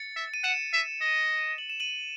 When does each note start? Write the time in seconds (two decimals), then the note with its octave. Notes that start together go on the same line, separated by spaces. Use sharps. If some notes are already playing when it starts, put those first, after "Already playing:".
Already playing: A6 C#7
0.16 E5
0.34 D#7
0.44 F#5 C#7 E7
0.73 E5
1.01 D#5
1.58 F#7
1.70 E7
1.80 D#7 F#7